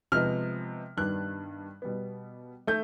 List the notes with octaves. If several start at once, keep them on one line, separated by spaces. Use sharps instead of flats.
C3 F3 G#3 B3 F6
G2 D#3 G3 B3 D4 F#6
B2 G3 B3
A3 G6